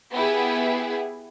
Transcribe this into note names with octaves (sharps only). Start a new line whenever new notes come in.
B3 E4 G4 G#4